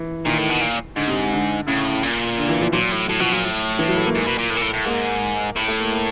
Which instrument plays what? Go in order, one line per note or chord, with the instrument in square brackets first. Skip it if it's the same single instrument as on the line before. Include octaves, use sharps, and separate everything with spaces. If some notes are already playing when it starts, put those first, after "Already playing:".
Already playing: [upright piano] E3
[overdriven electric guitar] A#2 [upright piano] D#3
[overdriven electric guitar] A2
B2
A#2
[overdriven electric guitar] G#2 [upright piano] D3
[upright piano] C3
D3
[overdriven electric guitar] A2 [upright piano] C#3
[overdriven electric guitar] A#2
[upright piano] D3
E3
F3
[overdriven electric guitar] A#2 [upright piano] F#3
[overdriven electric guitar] A2
[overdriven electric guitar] A2 [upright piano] F#3
[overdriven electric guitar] B2 [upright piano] F3
[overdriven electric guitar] A#2 [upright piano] F#3
[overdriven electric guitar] A2
[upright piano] E3
F#3
A3
A#3
[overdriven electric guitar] G#2
B2
A#2
A2
A#2
A2
A2
[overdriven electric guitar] G#2 [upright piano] A#3
[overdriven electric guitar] A2 [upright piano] A3
[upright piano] A3
A#3
A#3